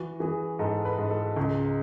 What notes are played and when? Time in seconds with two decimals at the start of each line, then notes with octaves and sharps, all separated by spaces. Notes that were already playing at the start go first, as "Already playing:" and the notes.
Already playing: E3 F#4
0.20 E3 G#4
0.59 G#2 A4
0.85 B4
0.98 G#2
1.11 A4
1.36 C#2